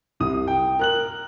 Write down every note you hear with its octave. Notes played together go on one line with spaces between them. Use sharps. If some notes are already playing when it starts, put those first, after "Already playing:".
C2 D#6
G5
A#4 F#6 F#7